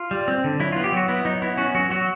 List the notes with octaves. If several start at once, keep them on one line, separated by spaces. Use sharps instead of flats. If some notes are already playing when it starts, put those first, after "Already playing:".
Already playing: F4
G3
C4
D3
F#3 E4
F4
B3
G4
F#3 F#4
B3 E4
F#3 D#4
B3 E4
C#4 F#4
F#3 F#4
F#3 F#4